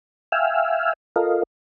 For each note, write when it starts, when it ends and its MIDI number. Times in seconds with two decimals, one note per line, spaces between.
0.32 0.93 76
0.32 0.93 77
0.32 0.93 79
0.32 0.93 80
0.32 0.93 88
0.32 0.93 89
1.16 1.43 65
1.16 1.43 69
1.16 1.43 70
1.16 1.43 75
1.16 1.43 77